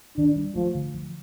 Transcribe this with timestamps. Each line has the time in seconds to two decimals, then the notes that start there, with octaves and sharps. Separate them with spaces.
0.17 D#3 D4
0.36 G3
0.55 F3 A3
0.75 D3
0.94 F3